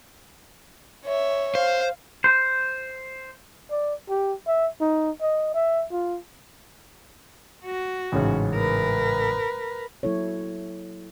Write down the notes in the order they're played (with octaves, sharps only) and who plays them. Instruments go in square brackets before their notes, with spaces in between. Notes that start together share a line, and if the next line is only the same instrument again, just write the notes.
[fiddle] C#5 E5
[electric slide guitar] C5 [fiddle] F5
[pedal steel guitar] C5
[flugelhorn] D5
G4
E5
D#4
D#5
E5
F4
[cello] F#4
[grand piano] A1 G#2 C#3
[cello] A#4 B4
[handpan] F#3 A#3 E4 A4 C#5